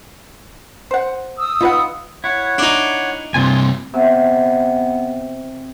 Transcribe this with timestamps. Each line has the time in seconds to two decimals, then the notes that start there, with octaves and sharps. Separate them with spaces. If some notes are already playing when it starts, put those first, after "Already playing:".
0.91 C5 F#5
1.39 D#6 E6
1.61 D#4 F4 B4 F#5
2.24 E4 C#5 F#5
2.58 D4 D#4
3.34 G2 C3 F4 G#5 C6
3.94 C3 B3